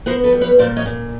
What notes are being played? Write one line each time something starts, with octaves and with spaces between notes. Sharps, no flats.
B3 A#4 C5
A4 B4
G3
B4 C#5
A#2 C5 D5
C#5 D#5
A#2